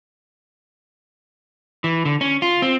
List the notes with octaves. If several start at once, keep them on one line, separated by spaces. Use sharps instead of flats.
E3
D3
C#4
F4
C4